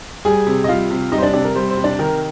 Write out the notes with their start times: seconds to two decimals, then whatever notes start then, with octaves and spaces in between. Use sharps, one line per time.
0.25 G3 G#4 G#5
0.47 C3
0.64 D#5
0.68 G3 F4 F5
0.91 C3
1.12 G3 D#4 D#5
1.18 C5
1.23 D4 D5
1.33 C3 D4 D5
1.45 A#4
1.55 G3 C5
1.70 C5
1.77 C3
1.84 D4 D5
1.99 D#3 A#4